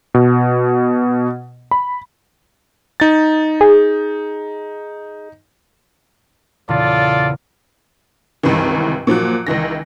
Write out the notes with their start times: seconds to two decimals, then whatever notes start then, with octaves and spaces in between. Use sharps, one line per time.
0.14 B2
1.71 B5
3.00 D#4 A6
3.61 G#4
6.69 E2 A#2 C#3 F4 A4 D5
8.43 C#2 G2 C3 D#3 E3
9.07 A#2 F3 F#3 F#6
9.47 C#2 D#3 E3 A#6